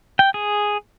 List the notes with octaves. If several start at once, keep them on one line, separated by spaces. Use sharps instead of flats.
G5
G#4